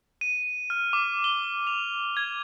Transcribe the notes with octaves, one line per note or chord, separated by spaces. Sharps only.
D#7
F6
D6
G7
F7
G#6